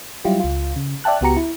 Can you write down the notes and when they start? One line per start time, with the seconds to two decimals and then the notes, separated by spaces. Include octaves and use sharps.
0.25 F#3 G3 E4 F4 G4
0.40 C#2 F4
0.76 C#3
1.04 D5 E5 G5 A5 F#6
1.21 C#2 B3 F#4 G4 A#5 C#7
1.37 E4